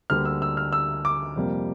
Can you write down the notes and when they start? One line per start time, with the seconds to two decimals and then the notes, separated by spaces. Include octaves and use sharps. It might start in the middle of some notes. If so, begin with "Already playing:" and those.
0.10 D2 D3 G3 A#3 F6
0.25 E6
0.42 E6
0.57 F6
0.73 E6
1.05 D6
1.36 F2 C3 G3 A#3